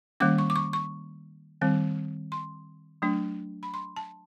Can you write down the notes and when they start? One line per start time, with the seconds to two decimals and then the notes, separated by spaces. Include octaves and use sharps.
0.20 D#3 G3 A#3 C#4 D6
0.38 C#6
0.50 D6
0.56 C#6
0.73 C#6
1.61 D#3 G3 C4
2.32 C6
3.02 F#3 A3 D4
3.63 B5
3.74 C6
3.97 A5